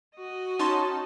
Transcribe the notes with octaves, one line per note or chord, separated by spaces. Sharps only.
F#4 D#5
C#4 D#4 A5 C6 C#6